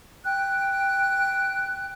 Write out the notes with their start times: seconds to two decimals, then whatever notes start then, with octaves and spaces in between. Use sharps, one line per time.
0.24 G5 F#6